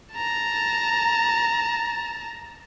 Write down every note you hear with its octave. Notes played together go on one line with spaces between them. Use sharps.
A5 A#5